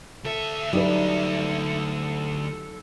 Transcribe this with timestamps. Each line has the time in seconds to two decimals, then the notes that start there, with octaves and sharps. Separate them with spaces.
0.24 D2 A4 E5
0.73 F#3 G3 D#4 A4 B4